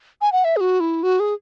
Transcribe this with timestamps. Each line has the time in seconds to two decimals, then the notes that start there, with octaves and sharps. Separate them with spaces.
0.21 G#5
0.32 F#5
0.44 E5
0.56 G#4
0.61 F#4
0.80 E4
1.03 F#4
1.20 G#4